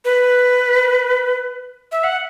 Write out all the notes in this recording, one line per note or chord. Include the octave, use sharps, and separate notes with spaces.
B4
E5
F#5